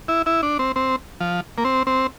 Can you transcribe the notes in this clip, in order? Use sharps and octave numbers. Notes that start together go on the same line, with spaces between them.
E4
E4
D4
C4
C4
F3
A#3
C4
C4